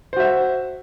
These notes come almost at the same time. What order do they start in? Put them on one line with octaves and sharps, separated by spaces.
C5 F#4 E5